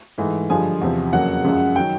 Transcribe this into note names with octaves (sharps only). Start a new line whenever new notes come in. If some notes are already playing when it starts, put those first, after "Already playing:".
G#2 E3 A3
G2 D3 F3 G#3 G#5
E2 C3 F3
F2 C#3 F#3 A#3 F#5
F#2 C#3 F3 G#3
D#3 F#3 G5